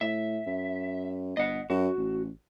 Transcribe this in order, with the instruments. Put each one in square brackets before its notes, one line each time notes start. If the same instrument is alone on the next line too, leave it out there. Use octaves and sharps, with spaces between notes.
[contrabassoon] A2 [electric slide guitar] E5
[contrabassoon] F#2
[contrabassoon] G1 [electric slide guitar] D#5 F#5
[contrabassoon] F#2 [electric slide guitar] F#4
[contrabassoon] A1